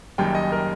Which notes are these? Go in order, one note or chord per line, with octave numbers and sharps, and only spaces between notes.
F#1 F#2 D#3 G3 G5
D#5
A#4